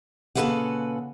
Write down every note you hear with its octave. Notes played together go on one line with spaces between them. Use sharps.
A#2 C#3 A4 B4 F5 F#5